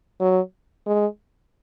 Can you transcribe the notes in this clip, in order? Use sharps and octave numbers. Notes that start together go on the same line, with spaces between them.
F#3
G#3